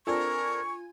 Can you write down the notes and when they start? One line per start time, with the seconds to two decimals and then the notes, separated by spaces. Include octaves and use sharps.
0.07 C4 D4 F4 A4 A#4 G#5 C#6 G#6